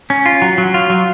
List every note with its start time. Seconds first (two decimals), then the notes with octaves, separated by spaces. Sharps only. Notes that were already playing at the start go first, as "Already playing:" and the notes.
0.10 C#4
0.26 F4
0.42 F#3
0.58 F#3
0.74 F4
0.90 F#3